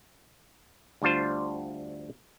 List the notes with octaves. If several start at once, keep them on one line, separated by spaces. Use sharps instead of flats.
D2 G3 D4 F4 C5